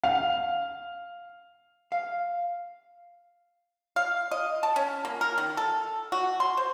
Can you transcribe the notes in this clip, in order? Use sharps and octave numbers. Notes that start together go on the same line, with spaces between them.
F5
F5
F5
D#5
A5
C#4
A#3
A#4
D#3
A4
F#4
C6
C5